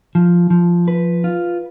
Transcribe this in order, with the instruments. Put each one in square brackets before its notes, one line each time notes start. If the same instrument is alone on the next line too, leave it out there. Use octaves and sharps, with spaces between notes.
[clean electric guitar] F3
F3
B4
F4